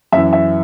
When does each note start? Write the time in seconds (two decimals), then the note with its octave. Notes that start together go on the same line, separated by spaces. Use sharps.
0.12 F#2 E5
0.17 E3
0.33 E5